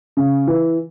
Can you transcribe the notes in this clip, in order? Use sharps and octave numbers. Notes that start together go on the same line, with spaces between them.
C#3
E3